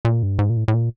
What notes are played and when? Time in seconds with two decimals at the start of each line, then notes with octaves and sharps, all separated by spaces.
0.05 A#2
0.23 G2
0.39 G#2
0.50 A#2
0.57 A2
0.68 A2
0.74 A#2